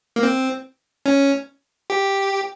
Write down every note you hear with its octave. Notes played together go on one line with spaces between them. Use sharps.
A#3
C4
C#4
G4